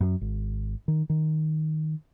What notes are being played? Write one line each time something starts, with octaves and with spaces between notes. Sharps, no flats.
F#2
G#1
D#3
D#3